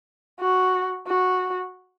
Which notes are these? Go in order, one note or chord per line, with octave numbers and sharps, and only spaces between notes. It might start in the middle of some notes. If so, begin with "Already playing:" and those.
F#4
F#4